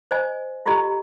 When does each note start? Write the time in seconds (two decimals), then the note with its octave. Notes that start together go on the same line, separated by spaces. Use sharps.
0.11 C5 D#5 G#5
0.66 E4 F4 G4 A4 D#5 A#5